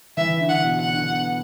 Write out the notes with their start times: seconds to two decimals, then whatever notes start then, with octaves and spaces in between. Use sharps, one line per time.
0.17 E3 E5
0.41 D3
0.49 F#5
0.64 B2
0.81 F#5
0.88 D3
1.11 B3